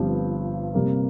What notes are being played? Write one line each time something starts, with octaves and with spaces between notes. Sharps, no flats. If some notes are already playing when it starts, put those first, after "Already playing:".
Already playing: G1 G2 F3 C4 G4
C3 G3 A#3